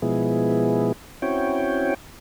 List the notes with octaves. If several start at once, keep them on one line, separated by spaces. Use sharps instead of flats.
B2 F3 G#3 B3 E4 G#4
C4 C#4 E4 F#4 C#5 G5